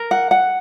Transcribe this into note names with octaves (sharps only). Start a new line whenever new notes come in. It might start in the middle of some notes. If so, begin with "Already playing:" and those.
Already playing: A#4
F#5
F#5